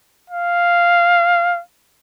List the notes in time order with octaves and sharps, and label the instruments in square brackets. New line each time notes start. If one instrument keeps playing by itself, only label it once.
[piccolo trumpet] F5